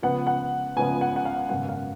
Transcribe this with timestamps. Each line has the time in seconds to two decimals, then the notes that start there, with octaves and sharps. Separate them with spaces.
0.02 C#2 C#3 F3 B3 F#5
0.27 F#5
0.76 C#2 C#3 F3 B3 G#5
1.01 F#5
1.16 F#5
1.25 F5
1.49 G#1 F#2 C#3 G#3 B3 F#5
1.69 F5